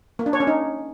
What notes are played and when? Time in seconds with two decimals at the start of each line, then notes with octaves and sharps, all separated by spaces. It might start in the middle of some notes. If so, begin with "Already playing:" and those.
0.19 A#3
0.26 D4
0.33 C#5
0.40 C#4
0.47 D#4